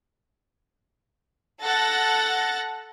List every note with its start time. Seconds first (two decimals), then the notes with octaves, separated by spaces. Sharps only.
1.61 A4 F#5 A6 A#6